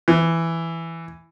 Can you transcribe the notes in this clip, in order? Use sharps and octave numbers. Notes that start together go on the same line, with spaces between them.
E3